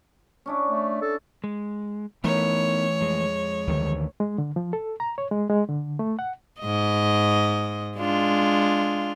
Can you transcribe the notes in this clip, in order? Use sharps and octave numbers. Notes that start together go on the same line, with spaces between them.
C#4 D4 E4
A3
A4
G#3
E3 A3 B3 D#4 A#4 C#5
F2 G#3
D2 D#3 E3
G#3
D3
F3
A4
A#5
C#5
G#3
G#3
D3
A3
F#5
G#2 D#5
G#3 D4 F4